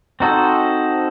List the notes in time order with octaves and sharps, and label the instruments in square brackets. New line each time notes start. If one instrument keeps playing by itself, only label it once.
[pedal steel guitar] C4 D#4 F#4 A4 C5